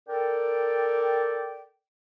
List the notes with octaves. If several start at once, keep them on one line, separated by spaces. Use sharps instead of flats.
A4 A#4 D5 G5